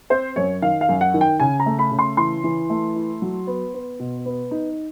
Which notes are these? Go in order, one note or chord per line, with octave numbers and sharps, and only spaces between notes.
C4 C5
F#2 C#5
D#3 F5
F5
F#2
F#5
D#3
G5
C#3 G#5
A#5
A3
B5
C#3
C6
E3 C6
E3
A3
E4
F#3
B3
B3
B2
B3
D#4